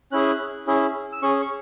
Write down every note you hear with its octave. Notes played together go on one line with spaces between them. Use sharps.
C#4 E4 G#4 F#6
C#4 E4 G#4
E6
C#4 G#4 C#6
C#6